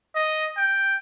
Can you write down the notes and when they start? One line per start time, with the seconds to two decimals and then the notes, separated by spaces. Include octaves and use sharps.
0.15 D#5
0.57 G5